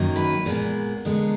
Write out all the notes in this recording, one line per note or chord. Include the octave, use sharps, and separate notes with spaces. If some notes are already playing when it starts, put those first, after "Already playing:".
Already playing: F#2 D#3 F#3 A#3
B4
A#2 G#3 B3 A#4
D3 G#3 B3